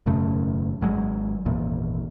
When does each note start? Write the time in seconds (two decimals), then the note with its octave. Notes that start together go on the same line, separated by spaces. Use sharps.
0.06 E1 F#2 C#3 A3
0.81 G#1 F#3 G#3
1.45 G#1 E2 A#2